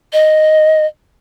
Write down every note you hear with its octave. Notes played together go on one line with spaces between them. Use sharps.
D#5